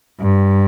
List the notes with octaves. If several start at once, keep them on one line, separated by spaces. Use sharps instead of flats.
G2